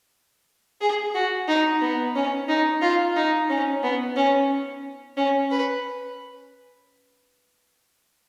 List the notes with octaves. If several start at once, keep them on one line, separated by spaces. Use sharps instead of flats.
G#4
F#4
D#4
B3
C#4
D#4
F4
D#4
C#4
B3
C#4
C#4
B4